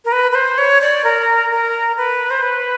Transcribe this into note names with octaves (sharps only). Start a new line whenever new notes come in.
A#4
B4
B4
C5
C#5
D5
A#4
A#4
B4
C5
B4